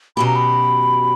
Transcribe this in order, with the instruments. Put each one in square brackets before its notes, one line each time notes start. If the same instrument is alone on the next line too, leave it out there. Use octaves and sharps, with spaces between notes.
[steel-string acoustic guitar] B2 F#3 C#4 G4 [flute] B5
[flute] A#5
B5